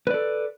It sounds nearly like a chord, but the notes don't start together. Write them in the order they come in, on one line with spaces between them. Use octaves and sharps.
B4 D5 A4